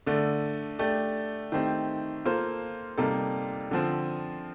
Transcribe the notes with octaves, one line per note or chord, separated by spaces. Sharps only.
D3 A3 D4
A3 D4 G4
D#3 A3 C4 G4
A#3 F4 A4 C5
C3 G3 A#3 D#4 A4
D3 F3 C4